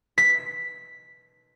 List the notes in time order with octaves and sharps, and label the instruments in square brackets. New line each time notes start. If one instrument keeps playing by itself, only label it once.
[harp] B6